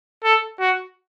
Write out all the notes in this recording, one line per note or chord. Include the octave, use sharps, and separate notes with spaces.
A4
F#4